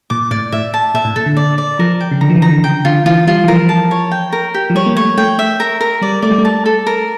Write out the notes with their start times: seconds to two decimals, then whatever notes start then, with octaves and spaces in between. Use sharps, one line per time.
0.10 A#2 D6
0.31 A2 D5
0.52 A2 E5
0.74 A5
0.94 A#2 E5
1.05 A2
1.16 A#2 A4
1.26 D3
1.37 D5
1.58 D5
1.79 F3 A#4
2.00 G5
2.11 C#3
2.21 D3 A#5
2.30 F3
2.36 E3
2.42 A#5
2.49 D3
2.64 C#3 G5
2.85 D3 F4
3.06 E3 F4
3.27 G3 F4
3.44 E3
3.48 F3 A#4
3.69 A5
3.91 C#5
4.11 G5
4.33 A#4
4.54 G4
4.70 F3
4.75 G3 C#5
4.86 A#3
4.96 A3 C#5
5.18 A3 G5
5.39 E5
5.60 A#4
5.81 A#4
6.02 G3 D5
6.22 A3 D5
6.31 G3
6.38 A3
6.45 A5
6.66 A4
6.86 A#4